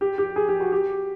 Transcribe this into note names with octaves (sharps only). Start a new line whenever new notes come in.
G4
G4
G#4
G4
F#4
G4